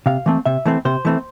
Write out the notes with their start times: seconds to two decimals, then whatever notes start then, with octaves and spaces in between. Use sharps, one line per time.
0.06 C3 F5
0.26 E3 A3 C4
0.46 C3 E5
0.66 E3 A3 C4
0.85 C3 C5
1.05 E3 A3 C4